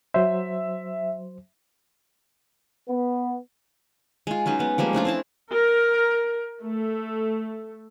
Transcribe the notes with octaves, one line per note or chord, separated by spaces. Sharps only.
F#3 C5 E5
B3
G#3 F4
F#3 C#4 D#4 B4
G#3 B3
F3 G3 G#3 A#3
A3 C#4 D4 F4
C4 E4 A5
A#4
A3